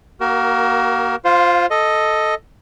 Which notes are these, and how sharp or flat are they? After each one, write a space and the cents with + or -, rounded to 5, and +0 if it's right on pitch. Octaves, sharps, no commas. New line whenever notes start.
A#3 +25 F#4 +35 A#4 +0
F4 +0 C5 +0 F5 +30
A4 +0 D#5 +0